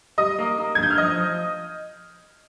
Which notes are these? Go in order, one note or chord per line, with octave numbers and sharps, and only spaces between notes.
G3 D#5 D#6
A#3
A#3
G#6
G2 G6
F6
F3 D#5 D#6
F3